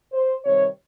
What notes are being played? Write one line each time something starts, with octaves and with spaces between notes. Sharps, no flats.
C5
C3 D#3 G3 C#5